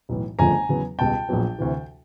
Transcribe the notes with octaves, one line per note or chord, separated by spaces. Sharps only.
B1 A2 E3
G1 F2 C#3 F3 A3 G#5 A#5
E2 C#3 F#3 B3
C#2 B2 G3 B3 G5 A5
A#1 A#2 F#3 B3
D2 C3 E3